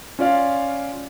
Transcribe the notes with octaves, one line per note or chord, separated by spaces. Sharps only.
C#4 F4 D5 F5